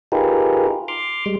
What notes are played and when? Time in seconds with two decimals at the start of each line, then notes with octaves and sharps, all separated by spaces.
0.12 D#4 F4 G4 G#4 A#4 B4
0.88 C6 D6 F6
1.26 G3 G#3